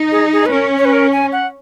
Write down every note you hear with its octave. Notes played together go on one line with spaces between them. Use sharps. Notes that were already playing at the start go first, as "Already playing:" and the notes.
Already playing: D#4
G#4
G#4
B4
C#4 A#4
C#5
B4
A#4
G#5
F#5